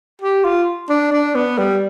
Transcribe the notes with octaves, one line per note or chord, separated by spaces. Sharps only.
G4
F4
D4
D4
B3
G3